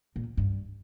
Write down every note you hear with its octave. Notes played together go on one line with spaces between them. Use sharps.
A#2
G2